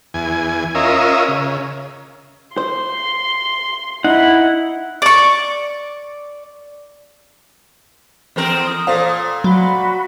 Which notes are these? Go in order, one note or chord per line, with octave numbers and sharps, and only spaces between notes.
E2 G#5
C#4 F4 A#4 D#5 E5
C#3
C5 C6
D#4 E4 F#5
D5 C#6
E2 C4 A#4
D#6
A#2 A4 C5 F5
F#3 F#4 B5